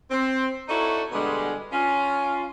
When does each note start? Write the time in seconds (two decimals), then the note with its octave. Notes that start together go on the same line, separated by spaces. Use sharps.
0.11 C4
0.69 D#4 E4 F#4 A4 C#5 D5
1.12 B2 D3 G3 G#3
1.72 C#4 F4